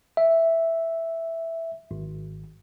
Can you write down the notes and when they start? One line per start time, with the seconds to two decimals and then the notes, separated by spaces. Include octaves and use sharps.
0.17 E5
1.91 G#1